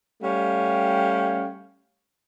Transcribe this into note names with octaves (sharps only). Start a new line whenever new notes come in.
G3 A3 C#4 F5 G5